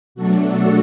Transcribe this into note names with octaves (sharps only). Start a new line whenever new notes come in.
B2 F#3 A3 D4 F#4 A4
F#4 A4